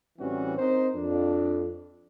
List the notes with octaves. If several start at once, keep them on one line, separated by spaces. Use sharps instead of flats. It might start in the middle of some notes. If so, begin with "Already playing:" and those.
A1 E3 G3 C4 C#4 F#4
C4 D#4 A#4 C5
F2 D4